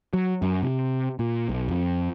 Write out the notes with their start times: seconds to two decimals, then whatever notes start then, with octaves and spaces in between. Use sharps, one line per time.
0.13 F#3
0.42 F#2
0.63 C3
1.19 A#2
1.49 B1
1.68 F2